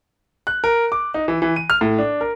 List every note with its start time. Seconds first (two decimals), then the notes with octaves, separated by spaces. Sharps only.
0.47 F#6
0.64 A#4
0.92 D6
1.14 D#4
1.28 E3
1.42 E3
1.56 D#7
1.70 F6
1.81 A2
1.99 D4
2.21 A#4